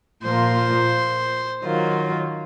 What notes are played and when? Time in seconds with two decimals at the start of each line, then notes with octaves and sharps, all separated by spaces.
0.24 A#2 F3 A#3 F4 A#4 C5
1.64 D#3 F#3 A#3 F4